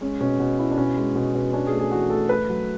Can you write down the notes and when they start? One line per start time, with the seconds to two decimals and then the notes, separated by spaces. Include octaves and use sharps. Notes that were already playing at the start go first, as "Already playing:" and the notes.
0.01 G#3 C#4
0.20 B2 C#4
0.40 B2
0.59 E4
0.71 D4
0.78 B2 C#4
0.97 G#3
1.15 B2
1.35 B2
1.53 C#4 D4
1.67 G#4
1.72 A3
1.79 G#4
1.91 E3 F#4
2.10 A3 A4
2.29 A3 B4
2.49 F#3